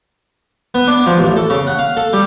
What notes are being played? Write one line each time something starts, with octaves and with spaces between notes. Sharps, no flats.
B3
D4
F3
A1
A4
C#3
F#5
F5
A4
G3